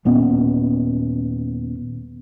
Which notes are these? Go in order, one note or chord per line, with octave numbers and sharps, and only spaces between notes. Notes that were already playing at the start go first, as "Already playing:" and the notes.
D#1 A#2 B3 C#4